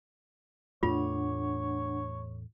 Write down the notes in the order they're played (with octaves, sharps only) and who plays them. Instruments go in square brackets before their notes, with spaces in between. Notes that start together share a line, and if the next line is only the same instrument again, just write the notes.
[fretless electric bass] E2 A2 A3 [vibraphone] D4 F#5 [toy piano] F4 [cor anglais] C#5